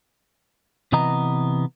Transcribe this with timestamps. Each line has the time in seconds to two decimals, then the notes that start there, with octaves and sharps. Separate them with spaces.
0.92 C3 E3 B3 D#5 A#5